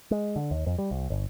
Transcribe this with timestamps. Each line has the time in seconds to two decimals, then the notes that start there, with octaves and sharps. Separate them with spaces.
0.11 G#3
0.36 D3
0.51 D#2
0.66 F2
0.78 G3
0.91 C2
1.10 G1